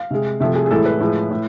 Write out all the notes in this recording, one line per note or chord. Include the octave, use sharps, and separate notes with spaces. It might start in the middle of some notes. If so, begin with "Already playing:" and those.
Already playing: F5
C3 G#3
C3 F3 A3 E5
G#4
G#4
A2 E3 G#3 A4
B4
A2 F3 G#3
A2